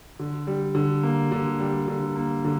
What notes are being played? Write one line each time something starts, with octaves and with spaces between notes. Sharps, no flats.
D3
G3
D3
A#3
D3
G3
D3
A#3
D3